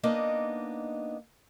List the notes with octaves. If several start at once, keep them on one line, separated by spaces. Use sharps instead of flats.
A#3 B3 D4 D#4 D#5